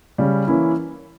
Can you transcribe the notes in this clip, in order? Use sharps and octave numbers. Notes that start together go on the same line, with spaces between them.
C#3 G3 C#4
E3 A#3 C#4 E4